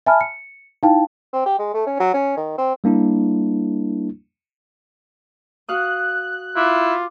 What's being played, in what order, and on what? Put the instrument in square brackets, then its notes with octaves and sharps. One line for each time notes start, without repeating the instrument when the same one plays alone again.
[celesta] E5 G#5 A5 B5 F6
C#7
D#4 E4 F5 G5 A5
[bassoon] C4
G4
G#3
A3
C#4
F#3
C#4
D#3
C4
[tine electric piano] G3 A#3 D4 E4
[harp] F#4 F5 D#6 [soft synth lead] F#6
[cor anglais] E4 [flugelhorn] F4 [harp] D6